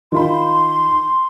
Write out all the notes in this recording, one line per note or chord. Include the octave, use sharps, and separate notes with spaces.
D#3 F4 B5 C6